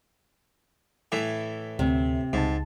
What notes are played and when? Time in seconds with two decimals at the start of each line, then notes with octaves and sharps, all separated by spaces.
1.12 A2 E3
1.79 D2 C3
2.33 C#2 G#2 A5